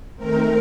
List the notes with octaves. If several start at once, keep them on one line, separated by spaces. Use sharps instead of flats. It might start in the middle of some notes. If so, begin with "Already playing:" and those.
D#3 A3 C4 A#4